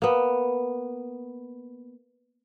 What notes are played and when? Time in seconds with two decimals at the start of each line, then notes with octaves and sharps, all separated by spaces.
0.02 A#3 B3